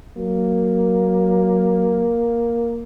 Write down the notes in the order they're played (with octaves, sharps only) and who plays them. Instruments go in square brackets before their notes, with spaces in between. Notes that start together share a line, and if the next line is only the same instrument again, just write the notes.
[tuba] F#3 [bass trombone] A#3